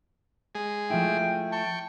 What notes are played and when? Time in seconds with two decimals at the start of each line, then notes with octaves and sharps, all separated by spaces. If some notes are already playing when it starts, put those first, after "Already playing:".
0.55 G#3 G#4
0.90 F3 A3 E4 G5
1.52 G5 A5 C#6